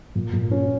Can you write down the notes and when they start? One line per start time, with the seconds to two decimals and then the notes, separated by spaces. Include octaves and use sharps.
0.15 A#2
0.33 A#2
0.51 C#4